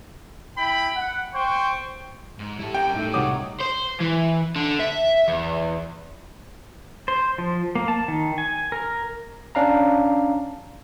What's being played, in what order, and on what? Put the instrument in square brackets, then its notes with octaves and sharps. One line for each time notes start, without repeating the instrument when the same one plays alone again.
[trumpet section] E4 G5 B5
F#5
C5 G5 C#6
[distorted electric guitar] G#2
[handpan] G3 [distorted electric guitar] E4 A4
[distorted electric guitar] C#4 A#4 [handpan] G4 [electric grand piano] G5
[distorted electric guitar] A2 [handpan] A3 D#4 E5
[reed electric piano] C2 D#6 [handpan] D#4 F#4 C#5 [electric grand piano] D6
[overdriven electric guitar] C5
E3
D3
E5
E2
[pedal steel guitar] C5
F3
A#3
A5
D#3
G#5
A#4
[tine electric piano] C#4 D4 F5 A#5